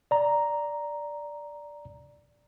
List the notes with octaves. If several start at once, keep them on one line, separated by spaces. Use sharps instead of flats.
D5 A#5